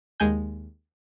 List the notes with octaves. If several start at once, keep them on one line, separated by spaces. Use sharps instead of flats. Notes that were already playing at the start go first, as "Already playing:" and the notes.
D#2 G#3 G#5 G6